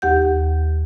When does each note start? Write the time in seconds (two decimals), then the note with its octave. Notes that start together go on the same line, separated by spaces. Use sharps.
0.02 D#2 G4 F#5 G6